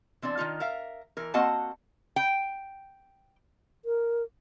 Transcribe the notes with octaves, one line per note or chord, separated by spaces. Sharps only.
E3 C4 D4 D5
D#3 G#3 D#4 F4
A#4 E5 F5
E3 A#4
A#3 C4 F#4 D#5 F#5 A5
G5
A#4